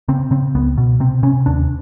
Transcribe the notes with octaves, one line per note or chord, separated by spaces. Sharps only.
C#3 C4
C#3 C4
C#2 B3
B2
C3 C4
C3 C#4
D#2 D4